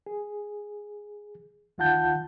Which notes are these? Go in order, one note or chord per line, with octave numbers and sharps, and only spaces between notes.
G#4
D2 D#3 F4 F#5 A5 G6